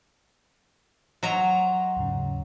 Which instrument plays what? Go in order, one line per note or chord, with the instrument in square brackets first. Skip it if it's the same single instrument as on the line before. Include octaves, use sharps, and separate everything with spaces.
[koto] F#3 A#5 [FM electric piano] D#5 C6
[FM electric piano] D#2 G#2 C#3